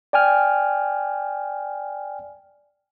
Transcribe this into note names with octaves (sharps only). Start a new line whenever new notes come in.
D5 G5 G#5 F6